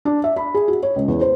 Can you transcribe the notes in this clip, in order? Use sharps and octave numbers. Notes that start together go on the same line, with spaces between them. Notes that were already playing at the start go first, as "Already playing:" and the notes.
D4
E5
B5
G#4
F#4
C#5
C#2
E2
C5